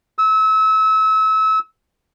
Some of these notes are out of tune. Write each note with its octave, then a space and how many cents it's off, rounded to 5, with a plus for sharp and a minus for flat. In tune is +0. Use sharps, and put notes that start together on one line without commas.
E6 -30